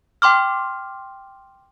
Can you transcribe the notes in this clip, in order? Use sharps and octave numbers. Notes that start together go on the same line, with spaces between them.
G5 C6 D6 F6